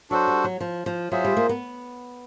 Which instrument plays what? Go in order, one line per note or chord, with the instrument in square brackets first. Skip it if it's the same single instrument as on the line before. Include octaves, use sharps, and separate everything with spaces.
[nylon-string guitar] F#3 [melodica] D4 F#4 A4 C5
[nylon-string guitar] G3
F#3
F3
F3
[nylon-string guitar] F#3 [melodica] F4 G#4 C5 E5
[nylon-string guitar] G3
A#3
B3